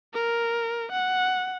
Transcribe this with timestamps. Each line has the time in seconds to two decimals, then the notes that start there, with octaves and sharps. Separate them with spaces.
0.14 A#4
0.92 F#5